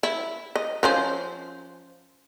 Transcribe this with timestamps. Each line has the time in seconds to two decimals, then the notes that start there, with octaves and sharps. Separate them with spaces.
0.03 E4
0.55 D#5
0.83 F3 C#4 C5